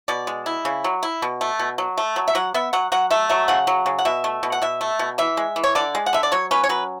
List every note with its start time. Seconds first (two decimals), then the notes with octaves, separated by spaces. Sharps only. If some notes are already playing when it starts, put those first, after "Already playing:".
0.08 B2 D5
0.27 G#3
0.46 E4
0.65 C#3
0.84 F#3
1.03 E4
1.22 B2
1.41 A3
1.59 B2
1.78 F#3
1.98 A3
2.16 F#3
2.28 E5
2.35 F#3 F#5
2.54 B3 E5
2.73 F#3 F#5
2.92 F#3 F#5
3.11 A3 E5
3.29 F#3 E5
3.48 C#3 F#5
3.67 F#3
3.86 C#3
3.99 F#5
4.05 B2 E5
4.24 A3
4.43 B2
4.52 F#5
4.62 B2 E5
4.81 A3
4.99 B2
5.18 E3 E5
5.37 G#3
5.56 E3
5.64 C#5
5.75 D3 D5
5.95 G#3
6.06 F#5
6.13 D3 E5
6.23 D5
6.32 F#3 C#5
6.51 C#4 B4
6.64 C#5
6.69 F#3 B4